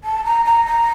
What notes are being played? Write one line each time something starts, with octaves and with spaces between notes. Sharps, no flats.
A5
A#5
A#5
A#5